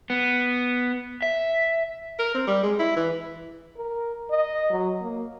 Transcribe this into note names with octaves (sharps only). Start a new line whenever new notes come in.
B3
E5
A#4
C4
G3
G#3
E4
E3
A#4
D#5
F#3
A#3